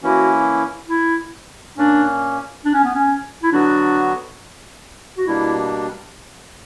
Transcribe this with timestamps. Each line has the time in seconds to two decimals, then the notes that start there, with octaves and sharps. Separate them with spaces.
0.02 E3 A#3 C#4 E4 F#4
0.89 E4
1.77 A#2 A#3 C#4 D4
2.65 D4
2.74 C#4
2.84 B3
2.95 C#4
3.43 E4
3.52 D3 F#3 B3 D4 F#4
5.17 F#4
5.26 B2 G3 A#3 D4 E4